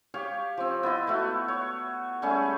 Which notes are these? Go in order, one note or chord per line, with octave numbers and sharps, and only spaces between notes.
G4 C#5 F5
F3 C4
B3 E4 D#5
A3 E4 F#4
C#5
G3 A3 C#4 G#4